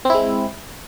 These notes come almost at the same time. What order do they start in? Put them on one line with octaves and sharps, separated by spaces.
C4 E4 G#3